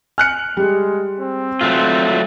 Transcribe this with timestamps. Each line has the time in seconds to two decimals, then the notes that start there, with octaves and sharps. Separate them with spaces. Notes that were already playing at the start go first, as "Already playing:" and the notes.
0.18 G#5 F6 F#6 C#7
0.57 G3 G#3 G#4
1.20 C4
1.61 F#3 A3 F4 F6